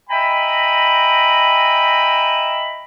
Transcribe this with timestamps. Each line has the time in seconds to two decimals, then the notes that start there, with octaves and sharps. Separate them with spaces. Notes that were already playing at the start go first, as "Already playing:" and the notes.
0.09 D#5 E5 G5 G#5 A#5 B5